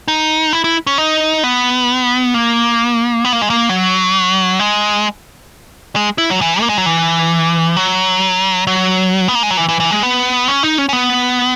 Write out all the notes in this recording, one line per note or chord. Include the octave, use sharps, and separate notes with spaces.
D#4
E4
E4
C#4
D#4
B3
A#3
B3
A#3
G#3
A#3
F#3
G#3
G#3
E4
F#3
E3
A#3
G#3
F#3
E3
F#3
F#3
B3
A#3
G#3
F#3
E3
E3
E3
G#3
B3
C#4
D#4
C#4
C#4
B3